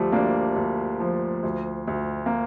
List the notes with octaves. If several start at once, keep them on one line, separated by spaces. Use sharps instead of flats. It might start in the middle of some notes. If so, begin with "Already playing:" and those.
Already playing: D2 F3 G3 A3
D2 A#3 D4
D2
F3
D2
D2
A#3